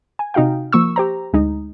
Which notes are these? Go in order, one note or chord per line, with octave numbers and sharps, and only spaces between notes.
G#5
C3 D#4 F#4 F5 G5
F3 A#3 C#6 E6
G4 C5 A#5
D2 G#3 D#4